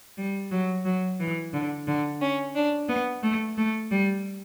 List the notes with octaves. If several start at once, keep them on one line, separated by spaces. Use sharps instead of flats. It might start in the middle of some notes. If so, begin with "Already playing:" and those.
G3
F#3
F#3
E3
D3
D3
C#4
D4
B3
A3
A3
G3